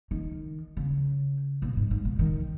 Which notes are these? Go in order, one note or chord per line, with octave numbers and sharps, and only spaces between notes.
D#3
C#3
B2
G#2
G#2
B2
D#3